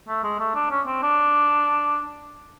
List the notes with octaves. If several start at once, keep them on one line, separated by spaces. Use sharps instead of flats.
A3
G#3
A3
D4
C#4
C4
D4